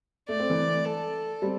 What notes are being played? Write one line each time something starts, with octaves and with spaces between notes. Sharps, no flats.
A3 D5
C4
E3 A3
A4
G3 C4